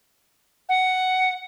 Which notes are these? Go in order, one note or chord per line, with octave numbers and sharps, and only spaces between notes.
F#5